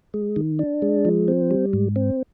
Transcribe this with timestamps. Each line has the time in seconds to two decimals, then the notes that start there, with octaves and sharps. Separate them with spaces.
0.14 G#3
0.36 D#3
0.59 D4
0.82 G#3
1.05 F3
1.28 C4
1.51 G3
1.73 G#2
1.96 C4